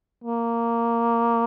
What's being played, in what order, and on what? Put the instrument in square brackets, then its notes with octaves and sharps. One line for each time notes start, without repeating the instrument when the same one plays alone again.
[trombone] A#3